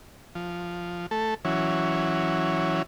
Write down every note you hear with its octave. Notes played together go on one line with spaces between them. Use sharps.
F3
A3 A4
E3 F#3 C#4